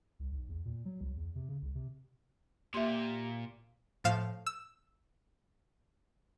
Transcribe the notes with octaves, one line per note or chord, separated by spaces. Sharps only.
C2
B1
E2
A#2
F#3
C2
E2
C3
C#3
C2
C3
A#2 G4 E5 C6
A2 F3 F5 E7
E6